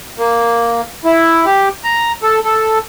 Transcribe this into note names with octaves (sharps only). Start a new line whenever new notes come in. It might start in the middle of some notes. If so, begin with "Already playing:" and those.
A#3
E4
G4
A#5
A4
A4